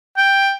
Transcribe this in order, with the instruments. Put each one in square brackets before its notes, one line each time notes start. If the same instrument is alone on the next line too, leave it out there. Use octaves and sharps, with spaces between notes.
[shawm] G5